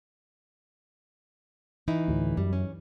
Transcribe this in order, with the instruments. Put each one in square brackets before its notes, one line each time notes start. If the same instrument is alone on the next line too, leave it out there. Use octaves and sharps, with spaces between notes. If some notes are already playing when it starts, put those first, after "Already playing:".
[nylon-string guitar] E3 D#4 E4
[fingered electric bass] D2 A2
[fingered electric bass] F#2 [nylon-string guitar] G3
[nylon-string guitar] C#4